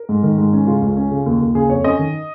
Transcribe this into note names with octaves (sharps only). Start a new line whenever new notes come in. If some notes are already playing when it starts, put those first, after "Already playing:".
Already playing: A#4
G#2
D#3
G#2
C#4
C#3 F4
C#2
C#4
C#3
D#2
D#2
C#3 G#4
F2 C#5
C#4 D#5
D#3